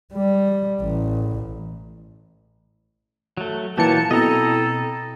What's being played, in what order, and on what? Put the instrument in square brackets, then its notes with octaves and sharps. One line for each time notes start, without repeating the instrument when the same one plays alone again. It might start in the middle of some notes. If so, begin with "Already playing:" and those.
[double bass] G3
A1
[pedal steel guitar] F#3 A3
[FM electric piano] A#2 E3 C#7 [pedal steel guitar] F#3 A#3 G4 [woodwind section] A5
[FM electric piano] B2 [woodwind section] C4 E4 A4 [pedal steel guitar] D#5 A#5